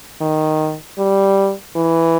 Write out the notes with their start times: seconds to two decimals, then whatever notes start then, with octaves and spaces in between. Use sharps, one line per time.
0.21 D#3
0.98 G3
1.76 E3